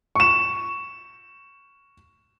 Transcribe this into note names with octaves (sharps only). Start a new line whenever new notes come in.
C#6 E7